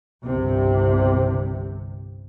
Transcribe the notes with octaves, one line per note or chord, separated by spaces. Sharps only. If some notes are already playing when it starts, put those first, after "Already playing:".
G1 C2 C3